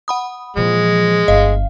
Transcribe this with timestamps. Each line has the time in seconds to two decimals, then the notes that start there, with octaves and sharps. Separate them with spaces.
0.08 F#5 B5 D#6
0.57 A#2 E3 F3 G#3
1.28 G1 D#5 F5